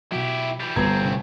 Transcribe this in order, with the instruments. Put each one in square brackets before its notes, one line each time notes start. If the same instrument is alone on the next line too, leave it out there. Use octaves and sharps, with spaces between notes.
[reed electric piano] B2 F#3 [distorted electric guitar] E4 G4
[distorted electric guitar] E3 G3
[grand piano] G1 G#6 [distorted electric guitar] A2 C4 [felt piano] G3 B3 [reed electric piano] A#5
[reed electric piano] C3 C#4